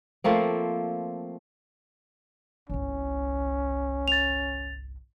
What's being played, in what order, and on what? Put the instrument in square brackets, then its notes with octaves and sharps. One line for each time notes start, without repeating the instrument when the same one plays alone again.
[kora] F3 A3 A#3 C4
[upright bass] G1 C2 [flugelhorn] C#4
[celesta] A6 F7